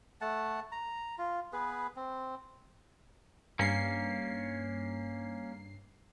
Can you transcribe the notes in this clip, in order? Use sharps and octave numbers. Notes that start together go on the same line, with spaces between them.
A3 F#5 A5
A#5
F4
B3 G#4 B4
C4
G2 A#3 C#4 C7